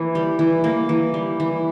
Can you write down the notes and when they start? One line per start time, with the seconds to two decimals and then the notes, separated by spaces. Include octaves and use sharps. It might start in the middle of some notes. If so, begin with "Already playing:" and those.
Already playing: E3 A#3
0.15 G3
0.39 E3
0.64 A#3
0.89 E3
1.14 G3
1.40 E3